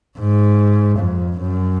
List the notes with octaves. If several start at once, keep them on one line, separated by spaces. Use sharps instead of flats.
G#2
F2
F#2